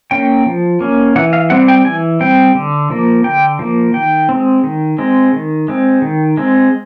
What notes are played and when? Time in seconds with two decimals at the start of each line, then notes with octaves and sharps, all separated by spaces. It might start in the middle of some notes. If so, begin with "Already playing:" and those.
0.11 A#3 C#4 G5
0.46 F3
0.81 A#3 C#4
1.16 E3 F#5
1.33 F5
1.50 G3 C4 F#5
1.68 G5
1.85 E3 G#5
2.20 G3 C4 G5
2.55 D3
2.90 F3 A#3
3.24 D3 G5
3.59 F3 A#3
3.93 D#3 G5
4.29 G#3 C4
4.64 D#3
4.98 G#3 C4
5.33 D#3
5.68 G#3 C4
6.02 D#3
6.37 G#3 C4